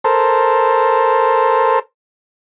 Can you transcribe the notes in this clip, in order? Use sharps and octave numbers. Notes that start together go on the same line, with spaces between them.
A4 A#4 C5